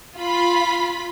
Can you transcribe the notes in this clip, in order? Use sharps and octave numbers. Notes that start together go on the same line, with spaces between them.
F4 B5